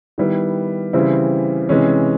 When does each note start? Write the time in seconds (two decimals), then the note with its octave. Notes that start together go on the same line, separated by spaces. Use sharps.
0.18 D#3 G3 B3 E4
0.93 C#3 E3 G3 C4 E4
1.69 C3 E3 G#3 C#4